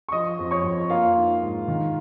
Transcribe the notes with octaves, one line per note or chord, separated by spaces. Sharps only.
C#6
F3 D#5 D#6
F2
C#5 C#6
F2
A#3 F4 F5
D#4
G#2
D#3